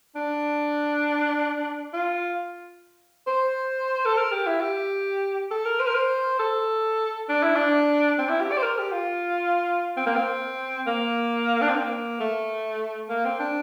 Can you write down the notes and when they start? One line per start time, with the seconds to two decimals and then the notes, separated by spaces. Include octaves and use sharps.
0.15 D4
1.93 F4
3.27 C5
4.05 A4
4.17 A#4
4.32 G4
4.46 E4
4.61 G4
5.51 A4
5.66 A#4
5.80 C5
5.87 A#4
5.95 C5
6.39 A4
7.29 D4
7.43 E4
7.56 D4
8.18 C4
8.29 E4
8.41 G4
8.51 D5
8.58 C5
8.63 A#4
8.78 G4
8.92 F4
9.97 C4
10.06 A#3
10.15 C4
10.86 A#3
11.61 D4
11.69 C4
11.75 A#3
12.20 A3
13.09 A#3
13.25 C4
13.39 D4